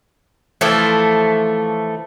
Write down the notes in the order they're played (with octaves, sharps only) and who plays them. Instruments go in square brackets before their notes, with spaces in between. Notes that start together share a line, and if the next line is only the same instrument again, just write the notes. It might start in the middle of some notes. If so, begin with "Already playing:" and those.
[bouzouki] E3 F3 A3